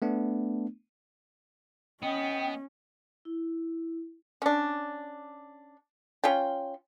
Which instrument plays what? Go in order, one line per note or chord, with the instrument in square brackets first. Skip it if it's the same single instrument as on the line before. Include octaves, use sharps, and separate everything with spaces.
[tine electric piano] A3 B3 D4
[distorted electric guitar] B3 [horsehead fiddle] C#4 [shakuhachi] D#5 [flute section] G5
[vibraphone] E4
[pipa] C#4 D4
C#4 F4 G5